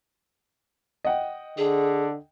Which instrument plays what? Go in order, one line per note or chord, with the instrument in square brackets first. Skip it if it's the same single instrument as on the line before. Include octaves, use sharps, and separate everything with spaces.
[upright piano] D#5 F#5 G5
[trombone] D3 [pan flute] G#4